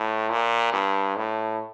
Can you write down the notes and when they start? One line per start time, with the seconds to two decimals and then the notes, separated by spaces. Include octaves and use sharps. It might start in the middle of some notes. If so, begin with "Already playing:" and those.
Already playing: A2
0.31 A#2
0.73 G2
1.16 A2